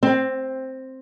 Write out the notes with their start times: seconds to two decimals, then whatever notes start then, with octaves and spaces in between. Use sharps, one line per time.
0.03 C4